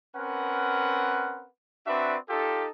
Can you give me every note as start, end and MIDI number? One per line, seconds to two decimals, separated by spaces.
0.16 1.48 60
0.16 1.48 61
0.16 1.48 70
0.16 1.48 71
0.16 1.48 78
1.87 2.17 60
1.87 2.17 62
1.87 2.17 66
1.87 2.17 71
1.87 2.17 74
1.87 2.17 76
2.29 2.68 63
2.29 2.68 65
2.29 2.68 67
2.29 2.68 69